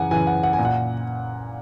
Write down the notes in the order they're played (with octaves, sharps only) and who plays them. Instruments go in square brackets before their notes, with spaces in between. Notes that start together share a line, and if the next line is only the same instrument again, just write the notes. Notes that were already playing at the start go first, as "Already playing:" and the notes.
Already playing: [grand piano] F#2 C#3 E3 F#5 G#5
F#2 C#3 E3 G#5
F#5
F#5
G#5
A#2
F#5